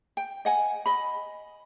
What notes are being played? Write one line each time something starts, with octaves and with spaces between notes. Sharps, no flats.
G5
D#5 F#5 G#5
D#5 B5